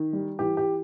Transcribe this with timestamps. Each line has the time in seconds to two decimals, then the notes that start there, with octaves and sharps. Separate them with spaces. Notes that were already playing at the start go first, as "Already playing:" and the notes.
Already playing: D#3
0.13 G3
0.39 E3 G4
0.57 G4